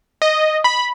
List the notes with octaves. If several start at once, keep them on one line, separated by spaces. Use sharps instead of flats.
D#5
B5